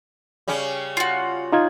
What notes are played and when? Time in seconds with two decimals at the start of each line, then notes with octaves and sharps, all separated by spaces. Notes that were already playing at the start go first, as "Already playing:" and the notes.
0.48 C#3 G3 C#4
0.97 F4 F#4
1.52 D#4 F4 G#6